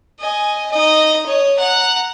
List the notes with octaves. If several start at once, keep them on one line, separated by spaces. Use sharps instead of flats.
D#5 G#5
D#4 D#5
C#5 D#5
F#5 A#5